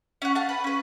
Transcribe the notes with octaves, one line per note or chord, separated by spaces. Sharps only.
C#4 F#5
F5 F#5 A5
B4
C#4 B4